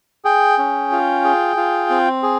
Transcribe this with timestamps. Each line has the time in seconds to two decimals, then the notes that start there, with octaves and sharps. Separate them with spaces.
0.25 G#4 G5
0.58 C#4
0.92 F4
1.24 G#4
1.57 F4
1.90 C4
2.23 G#4